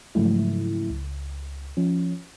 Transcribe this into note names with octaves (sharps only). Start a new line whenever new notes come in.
G#2 C#3 F3 F#3 A3 E4
C#2
F3 C#4